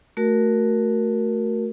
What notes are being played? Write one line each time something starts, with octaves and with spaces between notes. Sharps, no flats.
A3 F#4 A#4